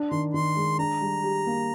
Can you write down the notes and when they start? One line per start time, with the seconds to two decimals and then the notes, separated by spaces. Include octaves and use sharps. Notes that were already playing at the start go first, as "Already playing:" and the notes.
Already playing: D4
0.11 D#3 C6
0.34 D#3 C6
0.56 G#3
0.78 D4 A#5
1.01 G3
1.24 G4
1.46 A#3